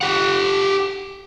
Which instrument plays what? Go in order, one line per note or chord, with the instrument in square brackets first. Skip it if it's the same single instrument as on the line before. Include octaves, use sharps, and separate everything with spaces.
[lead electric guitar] G4 F#5